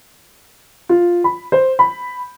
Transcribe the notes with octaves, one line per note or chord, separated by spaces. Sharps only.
F4
B5
C5
B5